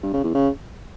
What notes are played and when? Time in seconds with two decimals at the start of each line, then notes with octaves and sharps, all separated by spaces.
0.03 G2
0.14 C#3
0.24 E2
0.35 C#3